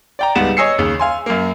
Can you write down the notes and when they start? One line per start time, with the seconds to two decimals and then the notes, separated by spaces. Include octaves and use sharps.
0.19 D5 G5 A#5
0.35 C#2 G#2 G3 B3 E7
0.57 C#5 D#5 G#5 E6 C7 C#7
0.78 D#2 C#3
0.99 F5 G#5 C6
1.26 F#2 A#3